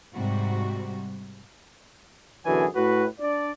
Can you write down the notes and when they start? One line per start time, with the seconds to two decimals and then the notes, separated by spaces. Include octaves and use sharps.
0.14 G#2 C3 G3 F#4
2.46 F#2 B2 D3 E3 G#4 G#5
2.75 A2 F#4 B4
3.20 D4 D5